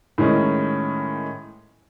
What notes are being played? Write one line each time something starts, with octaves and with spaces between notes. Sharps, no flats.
A2 D#3 G#3 C#4